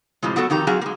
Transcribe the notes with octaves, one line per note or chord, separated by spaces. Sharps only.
A2 C3 F3 G#3
F#3 B3 F#4 A4
F2 D#3 G4 A#5
F#3 C4 F#4 G#4 F5
G#3 A#3